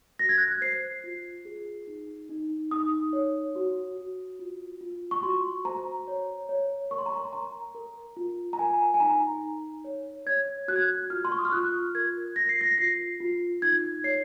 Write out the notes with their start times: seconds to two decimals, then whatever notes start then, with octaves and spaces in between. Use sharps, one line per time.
0.19 F#4 A#6
0.29 G#6
0.38 F#6
0.48 G#6
0.61 C5 C7
1.04 F4
1.45 G#4
1.87 D#4
2.29 D#4
2.71 D#4 D#6
3.13 C#5
3.56 F#4
3.97 F#4
4.39 F4
4.81 F4
5.11 C#6
5.23 F#4 C6
5.65 C5 A#5
6.08 C#5
6.49 C#5
6.91 A#4 C#6
6.98 C6
7.06 A#5
7.14 C6
7.33 A#4 A#5
7.75 A#4
8.17 F4
8.53 A#5
8.59 A#4 G#5
8.94 G#5
9.00 D#4 A#5
9.43 D#4
9.84 C#5
10.26 C#5 G#6
10.68 F#4 F#6
10.76 G#6
10.83 F#6
11.10 F4 F6
11.25 C6
11.32 C#6
11.39 D#6
11.45 F6
11.52 F4 F#6
11.95 A#4 G#6
12.36 F4 A#6
12.49 C7
12.61 A#6
12.78 F4 C7
13.20 F4
13.62 D#4 G#6
14.04 C#5 C7